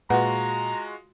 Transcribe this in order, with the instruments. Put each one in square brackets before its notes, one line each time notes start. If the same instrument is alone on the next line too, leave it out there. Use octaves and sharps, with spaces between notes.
[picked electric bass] A#2 [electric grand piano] G#3 F4 F#4 [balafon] B4 F#5 [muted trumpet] A#5